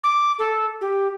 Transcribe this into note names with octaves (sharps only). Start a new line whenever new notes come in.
D6
A4
G4